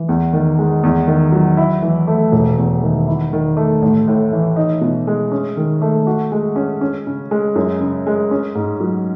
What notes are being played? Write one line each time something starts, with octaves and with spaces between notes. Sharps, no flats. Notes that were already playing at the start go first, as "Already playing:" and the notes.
Already playing: E3
E2
D#3
G#3
E2
D#3
F#3
E4
E3
A3
E1
E2
D#3
E4
D#3
A3
A1
A2
E3
D#4
B2
G#3
C#4
D#3
A3
F#4
G#3
C#4
C#4
C#3
G#3
F#2
C#3
G#3
C#4
G#2
F#3